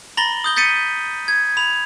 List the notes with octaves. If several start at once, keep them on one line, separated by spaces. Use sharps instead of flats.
A#5 B5 A6 A#6 F#7 G7
D#6 G6 G7
G6 A6 B6 C#7 D#7
G#6
B5 F7